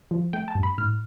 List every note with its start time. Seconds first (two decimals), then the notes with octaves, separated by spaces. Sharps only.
0.11 F3
0.33 A3 G5
0.48 A5
0.55 G2
0.63 B5
0.78 A2 F6